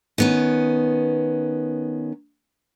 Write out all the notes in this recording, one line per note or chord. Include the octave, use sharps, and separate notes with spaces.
D#3 B3 C#4